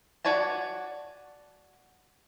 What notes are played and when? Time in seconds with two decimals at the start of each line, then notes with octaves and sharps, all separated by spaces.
0.25 F#4 C#5 D5 G#5 A5